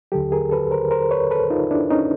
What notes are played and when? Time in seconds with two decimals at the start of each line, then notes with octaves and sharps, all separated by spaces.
0.12 D#2 D3 F#3 G4 A4
0.32 G#4 A#4
0.51 A4 B4
0.71 A#4 C5
0.91 A#4 C5
1.11 B4 C#5
1.31 A4 B4
1.50 D#4 F4
1.71 D4 E4
1.90 C#4 D#4